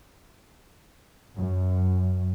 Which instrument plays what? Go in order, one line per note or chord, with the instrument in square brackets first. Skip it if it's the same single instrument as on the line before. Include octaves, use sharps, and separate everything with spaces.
[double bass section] F#2